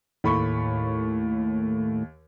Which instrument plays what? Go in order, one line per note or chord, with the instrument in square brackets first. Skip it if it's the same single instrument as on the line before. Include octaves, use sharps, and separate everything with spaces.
[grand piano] D#2 B5 C#6 [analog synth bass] A2